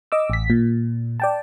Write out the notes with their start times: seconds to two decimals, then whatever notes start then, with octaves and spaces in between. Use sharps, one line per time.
0.12 D#5 D6 E6
0.30 A1 B6
0.50 A#2
1.20 D5 G5 A5